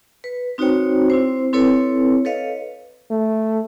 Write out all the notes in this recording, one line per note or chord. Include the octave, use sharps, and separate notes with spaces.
B4
C4 D#4 F#4 C5 C#5 G5
C4 E4 C5
C4 E4 A4 B4 C#5
A4 B4 C#5 D#5 F5
A3